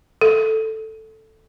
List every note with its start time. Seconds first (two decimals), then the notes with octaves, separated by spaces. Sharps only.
0.21 A4